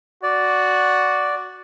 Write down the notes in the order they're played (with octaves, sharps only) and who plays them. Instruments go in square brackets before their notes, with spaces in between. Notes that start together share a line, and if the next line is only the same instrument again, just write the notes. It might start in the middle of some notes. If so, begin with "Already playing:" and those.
[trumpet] F#4 [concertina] D5